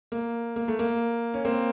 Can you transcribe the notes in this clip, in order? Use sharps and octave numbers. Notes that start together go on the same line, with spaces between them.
A#3
A#3
A3
A#3
C#4
A#3 C4